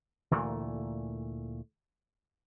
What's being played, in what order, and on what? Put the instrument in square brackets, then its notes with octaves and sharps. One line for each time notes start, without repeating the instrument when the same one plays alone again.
[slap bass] D2 A#2 E3 A3